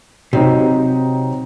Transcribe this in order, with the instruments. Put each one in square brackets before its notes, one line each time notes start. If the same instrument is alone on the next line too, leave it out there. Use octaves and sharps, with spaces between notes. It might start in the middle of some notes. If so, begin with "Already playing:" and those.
[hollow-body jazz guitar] C3 [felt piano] F#3 C4 D#4